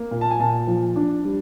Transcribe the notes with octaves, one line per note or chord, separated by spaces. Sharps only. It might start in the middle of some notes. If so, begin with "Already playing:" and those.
Already playing: A#3
A#2
A5
G#5
A#2 A5
F3
D4
G3